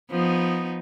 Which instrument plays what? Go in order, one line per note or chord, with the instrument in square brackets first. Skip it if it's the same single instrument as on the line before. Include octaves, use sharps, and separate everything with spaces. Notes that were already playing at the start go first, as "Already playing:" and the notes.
[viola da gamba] F3 B3 D#4